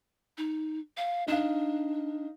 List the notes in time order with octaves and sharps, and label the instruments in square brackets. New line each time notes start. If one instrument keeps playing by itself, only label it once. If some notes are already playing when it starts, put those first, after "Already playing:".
[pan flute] D#4
F5
[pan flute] D4 [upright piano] D#4 F5